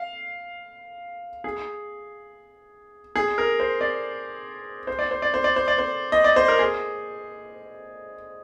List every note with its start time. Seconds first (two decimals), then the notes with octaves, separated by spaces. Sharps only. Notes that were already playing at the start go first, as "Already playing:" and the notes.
Already playing: F5
1.44 G#4
3.15 G#4
3.38 A#4
3.60 C5
3.81 D5
4.87 C5
4.99 D5
5.11 C5
5.22 D5
5.34 C5
5.44 D5
5.56 C5
5.68 D5
5.78 C5
6.12 D#5
6.24 D5
6.36 C5
6.48 A#4
6.59 G#4